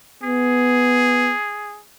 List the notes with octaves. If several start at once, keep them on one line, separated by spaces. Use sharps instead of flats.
B3 G#4